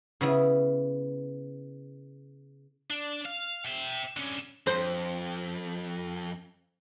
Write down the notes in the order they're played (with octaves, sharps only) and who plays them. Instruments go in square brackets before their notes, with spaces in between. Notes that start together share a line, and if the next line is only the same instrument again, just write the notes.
[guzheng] C#3 B3 E4
[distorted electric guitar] D4
F5
E5 G5
D3 C#4
[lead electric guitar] F2 [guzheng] C5